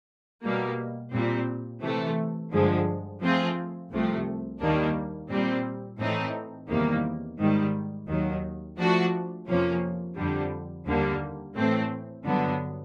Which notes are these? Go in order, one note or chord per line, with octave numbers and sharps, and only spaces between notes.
B2 G3 A#3
A#2 G3 C4
C3 E3 A3
G2 D3 F3 G#3
F3 A3 C4 F4 G#4
C2 C3 F3 A3
D#2 D#3 G3 A#3 D4
A#2 G3 C4
A2 E3 A3 C4 D#4
E2 C3 D#3 G3 A#3
G#2 D#3 G3
D#2 D#3 F#3
F3 A3 D4 F#4
F2 C3 F3 A#3 C#4
F2 D3 G3
D#2 D3 G3 A#3
A2 E3 A3 C4
G2 D3 F#3 B3